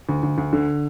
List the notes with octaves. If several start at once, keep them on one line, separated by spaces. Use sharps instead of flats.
D2
D2
D2
D3